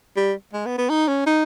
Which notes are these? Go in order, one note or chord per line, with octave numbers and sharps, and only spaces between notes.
G3
G#3
B3
B3
D#4
C#4
D#4